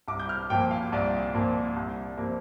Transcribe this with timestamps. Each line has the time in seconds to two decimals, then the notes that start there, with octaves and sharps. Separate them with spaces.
0.08 C2 D6
0.19 G6
0.29 F6
0.50 A#2 F3 A#3 G5
0.71 F5
0.92 C2 D5
1.34 A#2 F3 A#3
1.77 C2
2.17 C3 F3 A#3